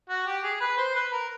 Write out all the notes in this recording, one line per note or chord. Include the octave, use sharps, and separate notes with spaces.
F#4
G4
G#4
B4
C5
B4
A#4